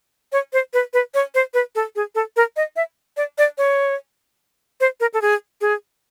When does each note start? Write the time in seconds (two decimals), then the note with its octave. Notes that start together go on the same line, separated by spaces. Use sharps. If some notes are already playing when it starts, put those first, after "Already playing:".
0.32 C#5
0.53 C5
0.73 B4
0.93 B4
1.14 C#5
1.35 C5
1.54 B4
1.75 A4
1.96 G#4
2.15 A4
2.36 A#4
2.56 D#5
2.76 E5
3.17 D5
3.38 D5
3.58 C#5
4.80 C5
5.00 A#4
5.14 A4
5.22 G#4
5.61 G#4